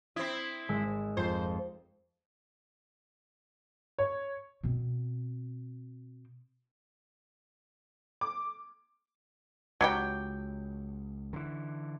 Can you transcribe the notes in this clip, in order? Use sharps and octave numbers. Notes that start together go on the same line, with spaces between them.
C4 E4 D#6
G#1 G#3 E6
F2 C5
C#5
B2 C4
D6
C#2 F#3 G4 G5
D3 E3